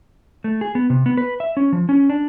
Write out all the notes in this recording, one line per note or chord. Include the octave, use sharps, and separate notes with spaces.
A3
G#4
B3
C3
B3
B4
E5
C#4
F3
C#4
D4